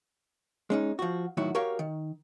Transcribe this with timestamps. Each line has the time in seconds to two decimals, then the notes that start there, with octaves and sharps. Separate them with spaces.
0.70 G#3 C#4 D#4
0.99 F3 F#4
1.37 A2 D#3 F#3 E4 F#4
1.55 F#4 G4 A#4 C#5 F5 G5
1.79 D#3